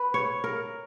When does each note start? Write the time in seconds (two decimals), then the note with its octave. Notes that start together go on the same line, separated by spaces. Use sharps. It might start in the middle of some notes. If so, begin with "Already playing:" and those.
Already playing: B4
0.14 C#5
0.44 A#4